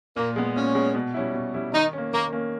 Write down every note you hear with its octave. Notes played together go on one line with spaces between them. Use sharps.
A#2 A#3
G#3 B3
A#2 C#4
G#3 B3
B2
G3 C#4 E4
B2
G3 C#4 E4
D#3 D#4
A#3 C#4
D#3 A#3
A#3 C#4